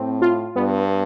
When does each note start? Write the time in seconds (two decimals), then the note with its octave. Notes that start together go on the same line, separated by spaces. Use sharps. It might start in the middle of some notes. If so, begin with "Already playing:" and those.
Already playing: A2 C4
0.22 F4
0.56 G2 B3